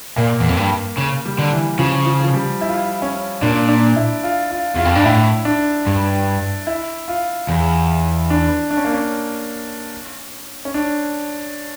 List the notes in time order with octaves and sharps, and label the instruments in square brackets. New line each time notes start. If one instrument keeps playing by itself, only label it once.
[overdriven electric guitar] A#2 [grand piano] A#3
[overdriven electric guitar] E2
F2
G2
C#3
[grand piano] G3
[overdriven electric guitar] D3
[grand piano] E3
[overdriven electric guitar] C#3 [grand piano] F3
[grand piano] F3
F3
G3
E4
F4
E4
C#4
[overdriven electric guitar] A#2 [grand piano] D4
[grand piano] D4
E4
F4
F4
[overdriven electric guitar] E2 [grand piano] F4
[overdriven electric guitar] F2
[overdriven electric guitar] G2 [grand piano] D4
[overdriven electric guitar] A2 [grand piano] E4
[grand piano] D4
[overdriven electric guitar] G2
[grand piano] E4
F4
[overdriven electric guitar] E2
[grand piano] D4
D4
C#4
A#3
C#4
C#4
D4